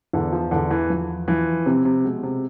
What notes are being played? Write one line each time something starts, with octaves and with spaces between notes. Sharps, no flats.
E2 D3
F3
E2 D3
E3
F3
E3 F3
C3 C4
C3
B2 G#3
C3